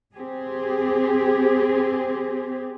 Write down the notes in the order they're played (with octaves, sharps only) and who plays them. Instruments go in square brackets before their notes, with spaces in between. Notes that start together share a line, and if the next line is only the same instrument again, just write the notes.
[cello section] C4 G4 G#4